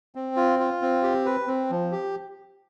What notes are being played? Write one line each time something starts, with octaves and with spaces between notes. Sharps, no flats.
C4
F4
F4
C4
G4
B4
C4
F3
G4